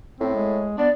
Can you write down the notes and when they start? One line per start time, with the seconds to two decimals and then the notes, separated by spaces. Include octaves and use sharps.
0.20 A2 C4
0.35 G#3
0.78 B3 D4 D5